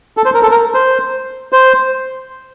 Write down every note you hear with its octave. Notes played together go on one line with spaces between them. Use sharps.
A4
C5
A#4
A4
A#4
C5
C5